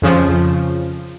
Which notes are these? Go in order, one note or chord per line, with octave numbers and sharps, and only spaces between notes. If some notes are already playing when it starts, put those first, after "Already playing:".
F2 C#3 F3